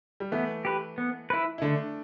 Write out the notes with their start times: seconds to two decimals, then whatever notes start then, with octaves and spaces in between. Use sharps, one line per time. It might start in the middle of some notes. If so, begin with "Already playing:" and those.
0.20 G3
0.32 E3 A3 B3
0.65 G4 B4
0.98 B3
1.30 E4 B4
1.58 E4
1.62 D3 A3 D4